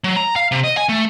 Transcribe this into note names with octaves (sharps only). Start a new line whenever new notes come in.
F#3
A#5
F5
C3
D#5
G#5
A3